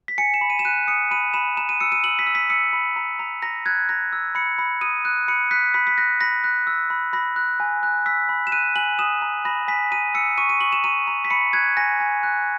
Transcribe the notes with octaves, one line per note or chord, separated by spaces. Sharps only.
B6
G#5 C#7
E7
B5
D#7
E7
F#6 D#7
D#6 C#7
B5 D#7
B5 E7
A#5 E7
D#7
E6 C#7
D#7
E6 F#7
B6
E6
B6
E6 C#7
B5
A#5
A#5
A#5 A#6
F#6 G#6
A#5 A#6
E6
B5 C#7
B5
D#6 D#7
F#6
B5 C#7
F#6 B6
B5 B6
B6
F#6 A#6
B5 A#6
F#6
E6
B5
B5 A#6
F#6
G#5
F#6
E6 B6
B5
E7
F#6 D#7
G#5 F#7
D#6 E7
A#5
B5 A#6
G#5 B6
A#5 D#7
E6 C#7
C#6 D#7
D#7
C#6 F#7
E7
A#5 D#7
A#5
B6
B5 C#7
F#6 G#6
G#5 A#6
G#5
F#6